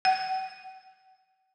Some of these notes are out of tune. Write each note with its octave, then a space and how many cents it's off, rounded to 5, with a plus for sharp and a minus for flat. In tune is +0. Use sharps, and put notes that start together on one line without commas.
F#5 +40